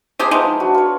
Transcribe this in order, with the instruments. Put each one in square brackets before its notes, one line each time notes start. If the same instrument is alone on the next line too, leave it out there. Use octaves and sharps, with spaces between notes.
[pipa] G#3 G4 G#4 [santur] F4 A5
[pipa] F3 G#3 D#4 [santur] B3 E4 B4
[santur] D4 F#4
F4 B4 C#5